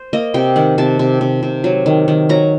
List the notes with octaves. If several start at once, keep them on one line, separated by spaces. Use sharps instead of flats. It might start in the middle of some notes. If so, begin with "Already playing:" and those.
Already playing: C5
A#3 D#5
C3 G5
D#3 F#5
C3 A5
C3
C3
C3
F#3
D#3
D#3
F#3 A#5